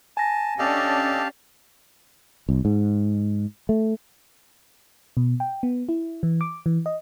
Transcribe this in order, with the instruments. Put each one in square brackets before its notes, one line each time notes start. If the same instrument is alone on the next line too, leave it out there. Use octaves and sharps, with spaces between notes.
[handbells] G#5 A#6 [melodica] A5
[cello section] C#4 D4 [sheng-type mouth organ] G4 F5 A5 [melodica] A4 D5 D#5
[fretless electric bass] C2
G#2
A3
[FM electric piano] B2
G5
B3
E4
E3
D6
E3
D#5